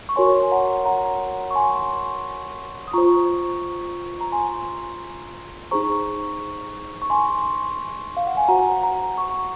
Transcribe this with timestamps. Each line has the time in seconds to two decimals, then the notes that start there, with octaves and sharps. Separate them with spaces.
0.09 C#6
0.16 F#4 A#4 C#5 G#5 C6
0.42 G#5
0.51 F#5 A#5
0.85 F#5 A#5
1.51 C#6
1.55 G#5 C6
2.88 D#6
2.93 F4 C5 A#5 C#6
4.21 A#5
4.32 G#5 C6
5.71 D#4 G#4 C5 A#5 C#6
7.02 C#6
7.10 G#5 C6
8.17 F5
8.27 F#5
8.37 G#5
8.48 F#4 C5 F#5 A#5
8.83 F#5 A#5
9.18 A#5 C#6